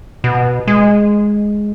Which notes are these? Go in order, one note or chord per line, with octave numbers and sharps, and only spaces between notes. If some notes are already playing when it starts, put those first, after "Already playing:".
B2
G#3